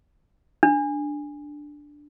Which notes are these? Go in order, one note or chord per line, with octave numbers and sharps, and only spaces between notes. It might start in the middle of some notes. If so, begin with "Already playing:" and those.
D4